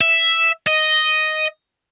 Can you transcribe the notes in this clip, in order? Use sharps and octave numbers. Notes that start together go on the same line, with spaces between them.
E5
D#5